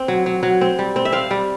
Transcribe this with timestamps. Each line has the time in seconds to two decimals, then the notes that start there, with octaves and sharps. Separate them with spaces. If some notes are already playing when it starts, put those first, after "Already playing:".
Already playing: C4
0.08 F#3
0.26 F#3
0.43 F#3
0.61 C4
0.79 G3
0.96 C4
1.05 E5
1.12 C4 F5
1.31 G3